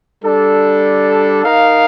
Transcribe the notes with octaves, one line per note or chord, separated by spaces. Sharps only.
G3 D4 A4
D#4 A#4 F5